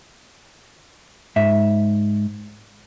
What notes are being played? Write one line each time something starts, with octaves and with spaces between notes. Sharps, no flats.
G#2 E5